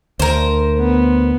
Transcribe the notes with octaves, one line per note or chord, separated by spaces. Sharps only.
D2 A#4 C5
B3